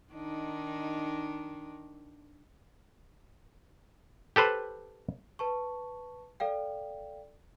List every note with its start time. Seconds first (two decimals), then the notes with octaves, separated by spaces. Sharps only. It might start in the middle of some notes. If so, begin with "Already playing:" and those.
0.13 D#3 D4 D#4
4.36 G4 A4 B4 C5
5.39 B4 A5 C#6
6.40 A4 D5 F5 G5